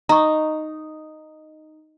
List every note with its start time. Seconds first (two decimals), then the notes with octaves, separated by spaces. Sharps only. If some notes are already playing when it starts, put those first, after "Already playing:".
0.09 D#4 A#5 C#6